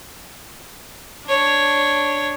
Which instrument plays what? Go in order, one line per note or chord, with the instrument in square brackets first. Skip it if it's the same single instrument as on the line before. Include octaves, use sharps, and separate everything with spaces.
[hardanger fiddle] D4 C#5